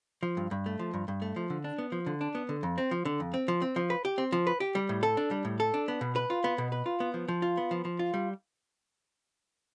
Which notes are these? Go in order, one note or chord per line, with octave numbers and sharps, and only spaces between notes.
F3
G2
G2
A3
F3
G2
G2
A3
F3
D3
D4
B3
F3
D3
D4
B3
D3
F2
C4
F3
D3
F2
C4
F3
C4
F3
B4
G4
C4
F3
B4
G4
G3
A2
A4
D4
G3
A2
A4
D4
B3
B2
B4
F4
B3
B2
B4
F4
B3
F3
F3
F4
B3
F3
F3
F4
G3